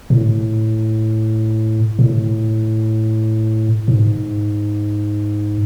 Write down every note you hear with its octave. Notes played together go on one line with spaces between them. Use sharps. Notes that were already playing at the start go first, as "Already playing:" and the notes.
A2
A2
G#2